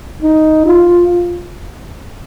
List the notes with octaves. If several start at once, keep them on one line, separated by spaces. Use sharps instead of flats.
D#4
F4